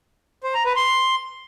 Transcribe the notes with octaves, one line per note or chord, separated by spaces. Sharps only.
C5
A#5
B4
C6